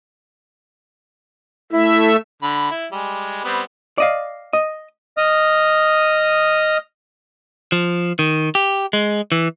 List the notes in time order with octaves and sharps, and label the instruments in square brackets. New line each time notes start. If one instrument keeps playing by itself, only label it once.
[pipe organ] A3 E5 [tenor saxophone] E4
[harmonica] D3 B5
E4
G3 G#3
G3 B3 C4
[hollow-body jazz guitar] D5 D#5 F5
D#5
[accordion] D#5 D#6 F6
[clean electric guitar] F3
D#3
G4
G#3
E3